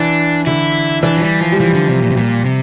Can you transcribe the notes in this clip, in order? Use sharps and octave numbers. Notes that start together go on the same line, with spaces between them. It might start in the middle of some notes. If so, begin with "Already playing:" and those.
Already playing: E3 D4
D3 E4
E3 D4
F3
G3
F3
G3
E3 F3
D3
C3
A#2
C3
A#2 G3
C3